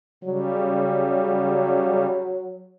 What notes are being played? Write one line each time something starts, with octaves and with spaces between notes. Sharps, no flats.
C#3 F#3 G3